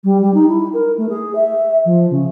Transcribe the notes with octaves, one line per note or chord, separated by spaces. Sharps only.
G3
G3
D#4
E4
A#4
A3
G#4
E5
F3
C#3